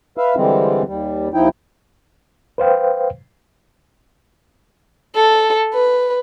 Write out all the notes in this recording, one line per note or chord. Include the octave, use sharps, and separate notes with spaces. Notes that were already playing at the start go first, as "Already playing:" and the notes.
B4 E5 F5
D3 E3 G3 G#3 C4
D#2 G3
D#2 F3 D#4 E4 G5
B4 C5 F5 G5
A4
B4